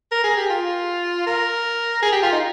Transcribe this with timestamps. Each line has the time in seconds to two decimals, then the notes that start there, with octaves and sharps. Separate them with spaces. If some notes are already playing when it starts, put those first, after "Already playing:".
0.11 A#4
0.24 G#4
0.37 G4
0.50 F4
1.27 A#4
2.02 G#4
2.12 G4
2.23 F4
2.32 D#4